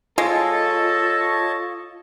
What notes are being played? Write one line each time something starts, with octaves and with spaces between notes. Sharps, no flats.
G#3 F4 A4 C#5 D#5 A5